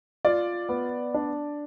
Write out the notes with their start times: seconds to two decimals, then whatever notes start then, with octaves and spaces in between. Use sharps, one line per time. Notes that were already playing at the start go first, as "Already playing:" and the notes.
0.25 F4 D5
0.69 B3
1.14 D4